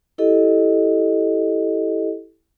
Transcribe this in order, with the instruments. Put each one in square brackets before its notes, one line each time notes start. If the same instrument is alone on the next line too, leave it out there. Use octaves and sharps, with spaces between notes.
[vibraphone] E4 G4 A4 D#5